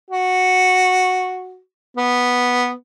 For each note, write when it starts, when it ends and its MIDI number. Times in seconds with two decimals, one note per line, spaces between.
0.11 1.59 66
1.97 2.71 59